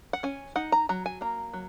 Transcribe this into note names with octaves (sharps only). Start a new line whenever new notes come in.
F#5
C#4 G#5
D#4 F#5
A#5
F#3 A#5
G#5
A#3 A#5
F#3